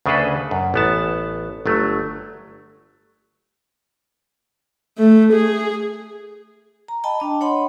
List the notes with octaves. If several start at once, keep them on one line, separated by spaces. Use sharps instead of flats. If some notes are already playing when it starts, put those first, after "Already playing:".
D2 C#3 D4 G#4 A4 B4
F#2
A1 B3 A5
G1 F#3 A3
A3
G#4
A#5
D#5 G5 A5 B5
D4 D#5
C#5 F#5 G5 B5 C6